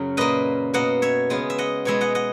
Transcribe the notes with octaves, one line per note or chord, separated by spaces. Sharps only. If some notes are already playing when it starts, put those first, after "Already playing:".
Already playing: F#2 C#3 F#3 F#4
A#2 A#3 B4 D#5
B2 A#3 D#5 F#5
C#5 E5
C#3 G#3 B3
E5
D#5 F#5
B2 G#3 B3 C#5 E5
D#5 F#5
D#5 F#5